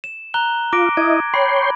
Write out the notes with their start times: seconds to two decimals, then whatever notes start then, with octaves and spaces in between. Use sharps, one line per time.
0.04 E7
0.34 A#5 F#6 G7
0.73 F4 D6 A#6 D7
0.97 E4 D#5 G#6
1.34 C#5 G5 B5 C6